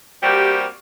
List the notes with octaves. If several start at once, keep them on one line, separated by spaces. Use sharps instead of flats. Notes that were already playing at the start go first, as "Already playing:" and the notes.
G3 A#3 C4 F#4 G4